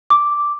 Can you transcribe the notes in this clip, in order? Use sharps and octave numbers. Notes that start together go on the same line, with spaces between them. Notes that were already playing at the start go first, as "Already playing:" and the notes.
D6